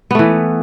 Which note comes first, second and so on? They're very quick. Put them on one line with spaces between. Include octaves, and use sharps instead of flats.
B3 A3 E3